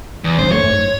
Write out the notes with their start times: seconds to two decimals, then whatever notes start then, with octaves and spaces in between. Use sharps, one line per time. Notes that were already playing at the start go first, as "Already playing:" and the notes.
0.24 E2
0.39 G#1 D3 F#3 C5
0.52 F#2 A3 C#5
0.68 G#2